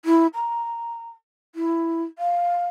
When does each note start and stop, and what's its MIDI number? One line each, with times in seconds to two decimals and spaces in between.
0.05 0.27 64
0.34 1.09 82
1.55 2.02 64
2.18 2.67 77